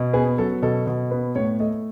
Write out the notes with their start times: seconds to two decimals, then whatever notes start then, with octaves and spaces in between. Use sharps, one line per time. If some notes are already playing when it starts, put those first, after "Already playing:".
Already playing: B2
0.13 B3 G#4
0.38 F#3 A4
0.62 B2 A4
0.87 B2
1.11 B3
1.35 A2 C#5
1.60 A3 D#5